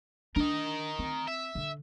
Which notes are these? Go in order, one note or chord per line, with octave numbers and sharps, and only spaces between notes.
D4 A#4 D#5
C4
E5
D3